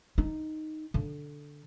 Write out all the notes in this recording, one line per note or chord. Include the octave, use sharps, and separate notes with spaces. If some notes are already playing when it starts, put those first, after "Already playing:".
D#4
D3